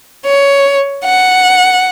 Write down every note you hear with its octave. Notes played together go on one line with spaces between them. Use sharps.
C#5
F#5